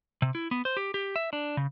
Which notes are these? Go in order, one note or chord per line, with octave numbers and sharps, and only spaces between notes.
C3
E4
B3
C5
G4
G4
E5
D4
C#3